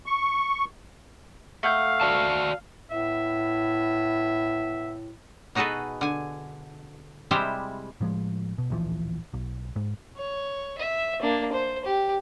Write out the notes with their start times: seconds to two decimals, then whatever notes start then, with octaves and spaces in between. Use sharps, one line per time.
0.06 C#6
1.63 A3 F5 F#5 G6
2.01 F#4 D5 A5
2.91 A2 B3 E5
5.55 B2 D#4 F#4 G#4 A4 B4
6.01 D3 G#5
7.31 C3 G3 G#3 E4 G4 C5
8.01 A2 F3 F#3 G#3
8.58 B2
8.70 D1 A#1 E3 F3
9.34 B1
9.76 G#2
10.16 C#5
10.78 E5
11.22 A#3 D4
11.52 C5
11.85 G4